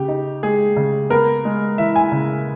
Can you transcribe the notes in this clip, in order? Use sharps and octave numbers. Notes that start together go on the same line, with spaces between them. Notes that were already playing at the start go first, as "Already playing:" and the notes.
Already playing: C#3 G4
D#4
G#3 G#4
C#3
B3 A#4
G#3
E3 E5
G#5
C#3